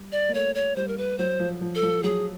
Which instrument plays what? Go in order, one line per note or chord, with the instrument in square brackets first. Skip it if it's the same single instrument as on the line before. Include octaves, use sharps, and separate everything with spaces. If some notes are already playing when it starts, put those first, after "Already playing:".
Already playing: [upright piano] G3
[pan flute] D5
[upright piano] A#3
[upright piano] A3 [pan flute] C#5
[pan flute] C#5
[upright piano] G3 [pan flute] C5
[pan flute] A#4
B4
[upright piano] F#3 [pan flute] C5
[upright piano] F3
F3
[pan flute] A4
[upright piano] F3
[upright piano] F#3 [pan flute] G#4